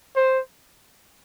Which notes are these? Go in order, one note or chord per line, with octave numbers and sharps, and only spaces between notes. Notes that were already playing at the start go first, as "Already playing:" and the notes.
C5